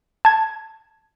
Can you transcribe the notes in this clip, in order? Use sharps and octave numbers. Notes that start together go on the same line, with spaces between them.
A5 G#6